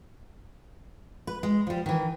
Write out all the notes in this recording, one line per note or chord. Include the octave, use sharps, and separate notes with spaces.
B4
G#3
F3 G3
D#3 E3